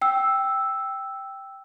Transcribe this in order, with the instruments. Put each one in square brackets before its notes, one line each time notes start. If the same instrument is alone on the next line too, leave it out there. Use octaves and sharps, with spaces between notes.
[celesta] G5 E6